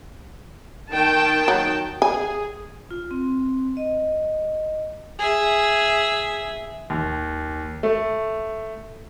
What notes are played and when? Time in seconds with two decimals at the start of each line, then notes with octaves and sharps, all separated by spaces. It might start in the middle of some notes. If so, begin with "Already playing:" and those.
0.92 D#3 G5 A5
1.48 F#3
2.02 G#4 G#5
2.91 F4
3.11 C4
3.77 D#5
5.19 G#4 E5
6.90 D#2
7.83 A3